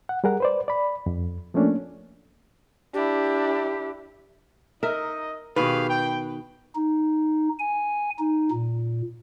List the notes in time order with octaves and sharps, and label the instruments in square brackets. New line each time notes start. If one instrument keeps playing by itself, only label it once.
[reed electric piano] F#5
G3 G#4 A#4 F#5
B4 C5 D5
D5 B5
F2
F3 A3 A#3 C#4 D4
[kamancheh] D4 E4 [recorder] G4
[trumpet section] D#4 D#5 [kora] A#4 E5
[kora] B2 D#3 [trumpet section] G4 G#4 F5 [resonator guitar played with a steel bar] B4
[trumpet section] G5
[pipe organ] D#4
G#5
D#4
A#2